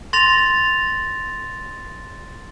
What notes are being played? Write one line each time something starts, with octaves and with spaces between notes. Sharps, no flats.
C6 A6 A#6 F7